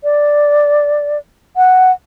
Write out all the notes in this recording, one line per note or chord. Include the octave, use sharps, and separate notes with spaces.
D5
F#5